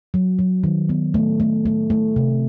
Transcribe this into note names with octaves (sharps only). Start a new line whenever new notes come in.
F#3
F#3
D#3
B3
A3
A3
A3
A3
C3